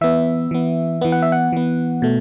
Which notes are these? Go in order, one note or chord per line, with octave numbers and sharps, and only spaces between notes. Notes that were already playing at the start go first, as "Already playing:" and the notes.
E3 B3 E5
E3 B3
E3 B3
F#5
E5
F#5
E3 B3
B2 A3